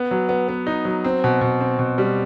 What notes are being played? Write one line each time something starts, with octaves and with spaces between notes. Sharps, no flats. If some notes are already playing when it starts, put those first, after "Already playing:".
Already playing: B3
F#3
B3
B3
D#4
F#3
C4
B2
B2
C4
B2
G3